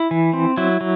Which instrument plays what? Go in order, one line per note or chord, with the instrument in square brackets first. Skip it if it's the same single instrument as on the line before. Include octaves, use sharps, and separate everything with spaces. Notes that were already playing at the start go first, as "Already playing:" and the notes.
Already playing: [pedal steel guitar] E4
E3
C4
F#3 E4
F#3